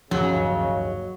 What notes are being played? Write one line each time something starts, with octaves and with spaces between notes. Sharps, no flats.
D1 G1 D#2 C#3 F3 F#3